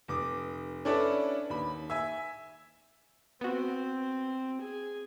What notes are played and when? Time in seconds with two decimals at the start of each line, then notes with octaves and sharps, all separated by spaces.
0.08 F1 D6 D#6
0.85 C#4 D4 E4 A4 B4 D5
1.50 D#2 B5
1.90 E5 G#5
3.41 B3 C4 F#4
4.61 G#4